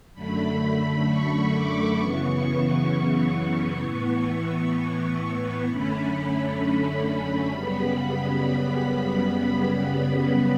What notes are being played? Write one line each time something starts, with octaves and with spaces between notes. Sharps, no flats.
F#2 D3 A3 B5
B5
C#6
D6
F#2 C#3 E3 B3 C#6
A2 E3 B3 C#6
F#2 D3 A3 C#4 B5
F#2 C#3 G3 B3 B5